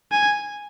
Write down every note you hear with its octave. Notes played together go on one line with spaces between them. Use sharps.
G#5